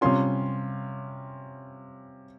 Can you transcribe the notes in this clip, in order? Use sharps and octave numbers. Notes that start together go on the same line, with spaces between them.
C3 G3 C#4 F4 C6